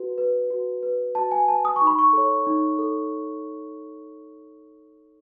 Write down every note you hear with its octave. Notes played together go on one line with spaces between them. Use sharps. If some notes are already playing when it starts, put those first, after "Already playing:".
Already playing: F#4 B4
B4
F#4
B4
F#4 A5
G#5
B4 A5
D#6
C#6
D#4
B5
C#6
A4 C#5
D#4
A4